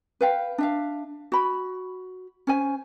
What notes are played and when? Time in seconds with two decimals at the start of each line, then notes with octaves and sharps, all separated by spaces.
0.21 B4 F5 G5
0.58 D4 E5 F5
1.32 F#4 B5
2.47 C#4 C5 G#5